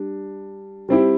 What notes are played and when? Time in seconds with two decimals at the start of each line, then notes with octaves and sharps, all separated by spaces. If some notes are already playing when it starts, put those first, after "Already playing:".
Already playing: G3 D4
0.89 G3 C4 E4 G4